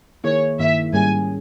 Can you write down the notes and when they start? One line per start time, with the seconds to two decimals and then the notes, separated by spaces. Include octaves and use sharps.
0.24 D#3 A#3 E4 G#4 C#5
0.59 G2 D#3 A#3 E4 E5
0.93 G#2 G3 A#3 C#4 G#4 G#5